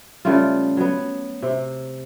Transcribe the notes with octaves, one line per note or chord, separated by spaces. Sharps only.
C#3 G3 A3 F4
F#3 B3
C3